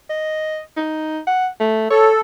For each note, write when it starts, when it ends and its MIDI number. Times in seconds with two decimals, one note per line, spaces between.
0.10 0.60 75
0.77 1.19 63
1.27 1.47 78
1.60 1.89 57
1.91 2.21 69
1.91 2.09 73